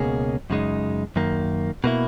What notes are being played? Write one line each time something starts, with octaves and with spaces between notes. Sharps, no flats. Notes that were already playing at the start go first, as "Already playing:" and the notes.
Already playing: C#2 B2 A#3 C#4 G#4
F#2 C#3 G#3 D#4
F#2 D#3 A#3
B2 A#3 E4